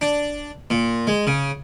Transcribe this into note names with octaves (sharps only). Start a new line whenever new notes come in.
D4
A#2
G#3
C#3